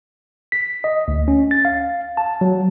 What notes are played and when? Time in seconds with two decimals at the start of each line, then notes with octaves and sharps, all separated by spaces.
0.52 B6
0.84 D#5
1.08 D2
1.28 C#4
1.51 A6
1.65 F5
2.17 A5
2.41 F#3